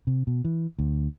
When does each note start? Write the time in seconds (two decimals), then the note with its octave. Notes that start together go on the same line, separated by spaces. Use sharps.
0.07 C3
0.27 B2
0.45 E3
0.79 D2